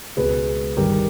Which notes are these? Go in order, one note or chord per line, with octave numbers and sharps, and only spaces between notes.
C#2 B2 G#4 B4
G1 G2 D#3 G4 A#4